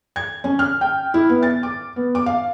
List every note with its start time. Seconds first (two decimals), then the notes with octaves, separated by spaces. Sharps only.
0.16 G#6
0.44 C#4
0.59 F6
0.81 G5
1.14 E4
1.29 B3
1.43 A6
1.63 D6
1.96 B3
2.15 D6
2.26 F5